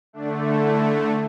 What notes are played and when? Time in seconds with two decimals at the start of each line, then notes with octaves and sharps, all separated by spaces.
0.13 D3 A3 D4
0.62 E4